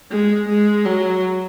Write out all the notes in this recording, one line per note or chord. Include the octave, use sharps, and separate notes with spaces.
G#3
G#3
F#3